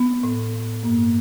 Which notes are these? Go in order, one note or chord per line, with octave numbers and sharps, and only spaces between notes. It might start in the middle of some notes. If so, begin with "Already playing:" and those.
Already playing: B3
A2
A2
G2 A#3